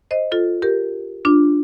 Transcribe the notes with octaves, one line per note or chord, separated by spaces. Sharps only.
C5 D#5
F4 A4
G4 A#4
D4 F4